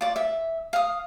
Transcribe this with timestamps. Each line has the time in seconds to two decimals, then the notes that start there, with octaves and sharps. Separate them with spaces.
0.01 F4 D5
0.16 E5
0.73 F5 D#6